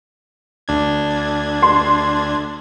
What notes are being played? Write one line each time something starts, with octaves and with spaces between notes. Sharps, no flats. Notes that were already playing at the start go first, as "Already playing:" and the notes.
D2 D4 G#6
C6